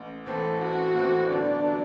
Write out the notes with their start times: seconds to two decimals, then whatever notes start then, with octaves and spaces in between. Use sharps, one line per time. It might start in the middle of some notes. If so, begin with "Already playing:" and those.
Already playing: A1
0.26 A2 E3 A3 C4 A4
0.61 A1 F#4
0.95 A2 E3 A3 C4
1.30 G1 D4
1.64 F#3